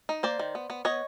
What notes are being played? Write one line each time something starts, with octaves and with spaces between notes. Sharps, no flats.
D#4
A#3 C5 D5
D#3
B3
B3
B3 C#5 D#5